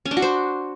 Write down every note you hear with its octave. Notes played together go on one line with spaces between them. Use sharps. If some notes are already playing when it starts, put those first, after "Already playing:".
C#4
D4
F#4
C5